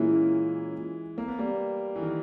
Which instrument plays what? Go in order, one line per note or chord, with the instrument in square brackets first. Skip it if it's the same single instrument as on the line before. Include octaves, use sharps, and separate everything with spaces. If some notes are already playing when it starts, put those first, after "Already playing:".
Already playing: [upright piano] A#2 A#3 C#4 E4 [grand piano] E3 G#3
[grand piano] A#3
B3
G3 A#3
E3
D#3